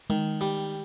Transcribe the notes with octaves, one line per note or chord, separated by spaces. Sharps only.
D#3 G#3
G3